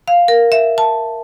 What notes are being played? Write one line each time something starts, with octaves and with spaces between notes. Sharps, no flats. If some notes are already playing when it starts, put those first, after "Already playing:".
F5
A#4
E5
A5